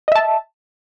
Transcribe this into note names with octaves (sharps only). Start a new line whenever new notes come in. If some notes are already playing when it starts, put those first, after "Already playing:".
D#5 E5 A5